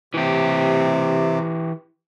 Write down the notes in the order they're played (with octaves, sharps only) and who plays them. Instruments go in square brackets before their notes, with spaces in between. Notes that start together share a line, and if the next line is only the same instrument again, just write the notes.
[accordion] C3 [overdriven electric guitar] E3 G4